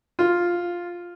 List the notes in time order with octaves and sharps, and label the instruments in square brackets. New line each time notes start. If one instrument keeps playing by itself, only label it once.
[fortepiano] F4